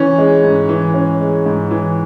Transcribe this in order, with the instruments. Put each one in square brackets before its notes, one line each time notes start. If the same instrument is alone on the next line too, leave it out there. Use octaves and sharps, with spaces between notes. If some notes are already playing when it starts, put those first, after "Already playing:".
Already playing: [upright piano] E3 C#4
G#3
G#2
E3
C#4
G#3
G#2
E3